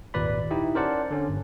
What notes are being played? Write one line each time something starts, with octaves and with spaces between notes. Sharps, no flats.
G#1 D#2 A#2 B4 D5 B5
D#4 E4 G4 D#5
C#4 A#4 C5 D5 F#5 A5
D3 C#4
G1